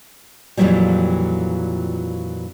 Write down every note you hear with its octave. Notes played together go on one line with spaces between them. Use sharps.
F2 A#2 C#3 E3 F#3 G3